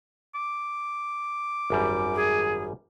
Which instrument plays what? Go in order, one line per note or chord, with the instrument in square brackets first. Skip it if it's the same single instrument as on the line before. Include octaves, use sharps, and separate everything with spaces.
[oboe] D6
[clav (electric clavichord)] G#1 F#2 G3
[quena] G#4